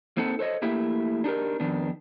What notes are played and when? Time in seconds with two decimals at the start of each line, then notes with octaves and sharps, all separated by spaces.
0.17 A#3 C4 D#4 A4 F#5
0.39 A4 C5 C#5 D#5
0.62 A3 A#3 E4 G4 E5
1.24 D4 D#4 G4 A#4
1.60 F2 D#3 B3 D4